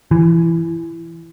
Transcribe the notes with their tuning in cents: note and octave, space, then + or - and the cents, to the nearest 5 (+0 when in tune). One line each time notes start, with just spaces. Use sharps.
E3 +15